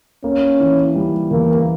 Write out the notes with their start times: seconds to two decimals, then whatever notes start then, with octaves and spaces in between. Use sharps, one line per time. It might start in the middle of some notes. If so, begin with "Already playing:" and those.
0.24 A#3 C#4
0.60 E3
0.96 G3
1.31 E2 A#3